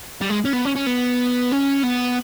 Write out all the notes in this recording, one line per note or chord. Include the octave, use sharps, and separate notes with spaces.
G3
G#3
C#4
B3
C#4
C#4
B3
C#4
B3